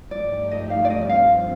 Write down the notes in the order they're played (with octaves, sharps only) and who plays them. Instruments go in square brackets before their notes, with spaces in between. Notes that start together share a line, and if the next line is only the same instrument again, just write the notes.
[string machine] G2 F3 A3 D#4 G4 [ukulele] D5
[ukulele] D#5
F5
D5
[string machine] G2 F3 C4 F4 [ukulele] D#5
[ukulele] F5